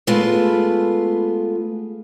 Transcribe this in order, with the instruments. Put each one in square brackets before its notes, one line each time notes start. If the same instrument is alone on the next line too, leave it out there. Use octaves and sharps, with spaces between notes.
[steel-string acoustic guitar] G#3 A3 B3 F4 B4